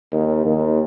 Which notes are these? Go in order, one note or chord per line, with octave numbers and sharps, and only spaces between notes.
D#2
D#2